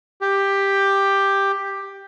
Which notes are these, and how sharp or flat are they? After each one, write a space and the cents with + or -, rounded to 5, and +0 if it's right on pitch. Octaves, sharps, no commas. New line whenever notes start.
G4 +10